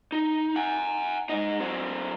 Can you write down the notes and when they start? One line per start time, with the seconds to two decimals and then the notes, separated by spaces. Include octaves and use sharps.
0.12 D#4
0.56 F#5 G#5
1.29 G#2 D#4
1.60 F#3 C4